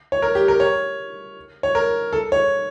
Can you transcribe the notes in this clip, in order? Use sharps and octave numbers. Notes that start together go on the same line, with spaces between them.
C#5
A#4
G4
A#4
C#5
C#5
A#4
A4
C#5